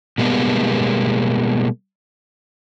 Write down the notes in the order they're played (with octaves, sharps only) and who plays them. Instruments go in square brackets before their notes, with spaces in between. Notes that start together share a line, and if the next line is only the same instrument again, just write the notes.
[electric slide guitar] B2 G3 G#3 A#3 B3